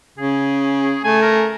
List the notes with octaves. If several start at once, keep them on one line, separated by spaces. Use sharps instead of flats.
C#3 G#4
A3 G#5
A#4